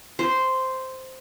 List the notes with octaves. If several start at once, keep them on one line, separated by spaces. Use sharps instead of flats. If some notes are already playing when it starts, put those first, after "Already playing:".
C5